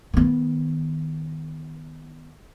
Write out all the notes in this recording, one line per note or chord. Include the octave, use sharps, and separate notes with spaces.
D#3 B3